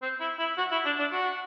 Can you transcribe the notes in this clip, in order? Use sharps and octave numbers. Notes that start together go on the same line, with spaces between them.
C4
E4
E4
F#4
E4
D4
D4
F#4